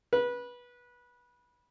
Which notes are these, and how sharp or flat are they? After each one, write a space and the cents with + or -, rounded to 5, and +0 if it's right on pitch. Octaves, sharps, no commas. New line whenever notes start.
B4 -20